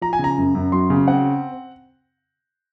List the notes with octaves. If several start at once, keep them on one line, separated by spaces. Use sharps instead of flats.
F3 A#5
G#5
C#3 A#5
F#2
F#2
F#3 C6
C#3
C4 F#5